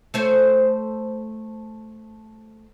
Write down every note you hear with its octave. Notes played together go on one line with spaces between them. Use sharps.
A3 C5 C#5